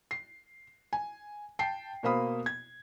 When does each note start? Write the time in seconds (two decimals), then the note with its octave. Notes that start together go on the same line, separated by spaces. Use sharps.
0.11 C7
0.93 G#5
1.59 G5 A5 C7
2.03 B2 A#3 C5 F5 B5 D#6
2.46 G#6